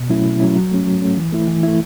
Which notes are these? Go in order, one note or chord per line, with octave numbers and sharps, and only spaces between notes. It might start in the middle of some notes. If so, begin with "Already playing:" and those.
Already playing: B2
F#3 A3 C#4 E4
B2
F#3 A3 C#4 E4
F#3
A3 C#4
F#3
A3 C#4
E3
A3 E4
E3
A3 E4